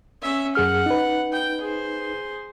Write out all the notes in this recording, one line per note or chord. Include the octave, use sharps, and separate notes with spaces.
C#4 E5
F#2 G#4 F#5 F6
D#4 B4
G5
G#4 C5